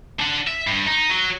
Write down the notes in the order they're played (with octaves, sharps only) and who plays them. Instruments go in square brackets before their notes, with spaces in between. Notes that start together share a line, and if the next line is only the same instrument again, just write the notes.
[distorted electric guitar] D4 F#5
E5
G2
D#4
F#3